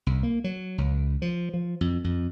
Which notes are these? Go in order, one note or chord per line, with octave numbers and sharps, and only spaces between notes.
C2
A#3
F#3
C#2
F3
F3
F2
F2